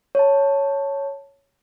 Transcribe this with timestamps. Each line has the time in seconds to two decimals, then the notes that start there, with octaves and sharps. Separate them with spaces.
0.15 C#5 A5